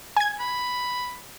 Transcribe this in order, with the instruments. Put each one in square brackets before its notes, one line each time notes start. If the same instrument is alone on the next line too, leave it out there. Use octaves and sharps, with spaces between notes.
[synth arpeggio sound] G#5 G#6
[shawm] B5